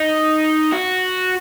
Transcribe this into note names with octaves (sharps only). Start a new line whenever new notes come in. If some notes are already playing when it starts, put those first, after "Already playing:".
Already playing: D#4
F#4